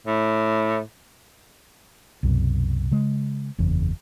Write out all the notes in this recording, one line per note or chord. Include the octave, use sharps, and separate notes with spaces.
A2
C2 F#2 B2
C#3 G#3
F#1 E2 C#3